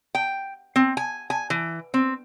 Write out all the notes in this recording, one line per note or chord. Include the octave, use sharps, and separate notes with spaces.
G5
C4
G#5
G#5
E3
C4